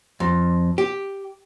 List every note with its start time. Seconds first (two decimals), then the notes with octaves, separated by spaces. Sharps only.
0.20 F2
0.78 G4